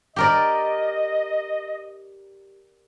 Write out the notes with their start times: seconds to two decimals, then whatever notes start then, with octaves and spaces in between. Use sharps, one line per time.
0.16 G4 A#4 D5 D#5